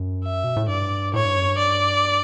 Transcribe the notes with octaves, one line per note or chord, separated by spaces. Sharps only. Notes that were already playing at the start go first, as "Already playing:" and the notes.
Already playing: F#2
E5
B2
A2
G2 D5
A2 C#5
G2
F#2
G2
D5